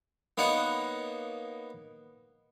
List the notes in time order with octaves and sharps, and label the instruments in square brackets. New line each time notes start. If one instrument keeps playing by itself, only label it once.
[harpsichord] A#3 B3 D#4 C#5 F#5